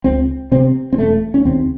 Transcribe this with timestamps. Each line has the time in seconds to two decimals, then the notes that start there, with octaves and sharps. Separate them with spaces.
0.04 C#2 C4
0.51 C3 C4
0.93 C4
0.98 E1 A3
1.34 C#4
1.45 D#2 C#3 C4